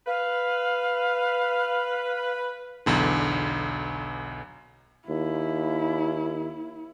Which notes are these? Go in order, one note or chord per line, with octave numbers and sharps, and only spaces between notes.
B4 F5
B1 E2 D3
D#2 E4